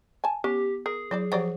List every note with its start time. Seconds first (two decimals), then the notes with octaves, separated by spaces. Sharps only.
0.24 G#5 A5
0.44 B3 C#4 G4
0.86 G#4 A#4
1.11 F#3 E4 C5 D5
1.32 F3 F#3 G4 C#5 D5 F#5